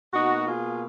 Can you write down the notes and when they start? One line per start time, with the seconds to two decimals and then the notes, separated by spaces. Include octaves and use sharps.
0.13 B2 A#3 D#4 F#4
0.48 F4 G#4